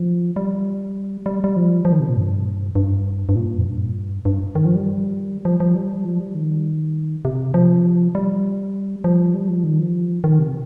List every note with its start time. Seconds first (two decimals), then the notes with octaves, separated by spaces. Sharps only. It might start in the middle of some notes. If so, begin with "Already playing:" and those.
Already playing: F3
0.36 G3
1.26 G3
1.44 G3
1.56 F3
1.85 F3
1.92 D#3
2.00 C3
2.08 A#2
2.16 G2
2.75 G2
3.29 G2
3.36 A#2
3.58 F2
3.66 G2
4.25 G2
4.55 D#3
4.65 F3
4.75 G3
5.45 F3
5.60 F3
5.75 G3
6.05 F3
6.20 G3
6.35 D#3
7.25 C3
7.54 F3
8.15 G3
9.04 F3
9.34 G3
9.49 F3
9.64 D#3
9.79 F3
10.24 D#3
10.39 C3